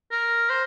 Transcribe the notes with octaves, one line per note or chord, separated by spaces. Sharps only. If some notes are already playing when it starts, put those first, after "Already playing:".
A#4
C5